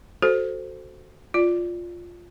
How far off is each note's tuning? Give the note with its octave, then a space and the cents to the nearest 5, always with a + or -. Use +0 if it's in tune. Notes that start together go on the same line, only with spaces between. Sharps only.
F#4 +0 A4 +0 C5 +0
F4 +0 D5 +0